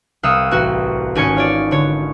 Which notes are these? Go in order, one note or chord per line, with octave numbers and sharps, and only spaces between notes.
C2 F5 F#5 D#6 E6
A1 F#4
G#1 C#4 G#5 C#7
F4 C#5 D5
D3 C#5